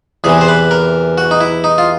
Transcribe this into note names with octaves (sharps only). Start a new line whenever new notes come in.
E2 C3 E3 G#4
C5
B4
A#4
F#4
D#4
E4
D#4
F4